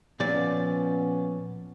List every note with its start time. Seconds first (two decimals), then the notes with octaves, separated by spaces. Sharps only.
0.20 A#2 F3 B3 C#4 D5